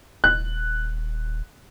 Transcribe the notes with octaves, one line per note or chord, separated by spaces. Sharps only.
D#1 F#6